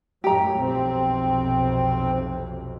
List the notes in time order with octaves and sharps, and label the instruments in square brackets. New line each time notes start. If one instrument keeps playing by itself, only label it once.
[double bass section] F#2 A2 F#3 [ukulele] G4 A#5
[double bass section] B1 F2 C3 [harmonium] C4